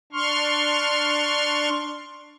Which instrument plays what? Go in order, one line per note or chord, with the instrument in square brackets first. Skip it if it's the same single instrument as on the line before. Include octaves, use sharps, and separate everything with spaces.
[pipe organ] D4 C6 C#6 F6